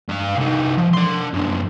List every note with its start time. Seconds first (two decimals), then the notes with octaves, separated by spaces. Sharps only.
0.09 G2 F5
0.37 C2 D#4
0.78 F3
0.93 D4 C6
1.34 F#2 D3